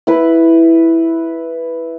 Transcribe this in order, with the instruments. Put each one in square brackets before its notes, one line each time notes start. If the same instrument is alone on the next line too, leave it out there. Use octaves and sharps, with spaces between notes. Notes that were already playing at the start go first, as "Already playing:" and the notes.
[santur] E4 B4